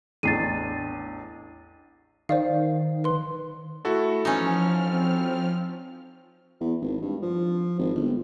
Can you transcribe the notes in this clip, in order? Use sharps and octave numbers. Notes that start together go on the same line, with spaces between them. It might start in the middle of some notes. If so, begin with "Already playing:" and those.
A1 E2 D4 A6 C7 D#7
D#3 C5 D5 F5
B4 C6
A3 E4 F#4 A4
E3 F3 C#4 D#4 F6
C4
E2
G#1
G2
F3
G#1
G1